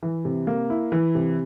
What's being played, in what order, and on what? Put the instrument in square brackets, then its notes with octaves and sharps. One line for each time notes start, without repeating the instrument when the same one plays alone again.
[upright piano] E3
C3
A#3
E4
E3
C3